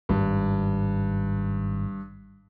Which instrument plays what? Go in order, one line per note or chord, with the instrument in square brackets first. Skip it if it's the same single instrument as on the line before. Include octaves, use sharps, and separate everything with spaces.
[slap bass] G#1 [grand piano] G2